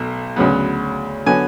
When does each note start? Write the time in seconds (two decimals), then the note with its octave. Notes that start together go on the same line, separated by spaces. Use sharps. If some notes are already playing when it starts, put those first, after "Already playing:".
Already playing: B1 B2 A3
0.36 D2 C#3 F#3 B3
1.26 D3 F#3 B3 G#5